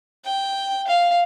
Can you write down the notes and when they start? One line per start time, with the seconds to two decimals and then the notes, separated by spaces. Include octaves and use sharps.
0.25 G5
0.87 F5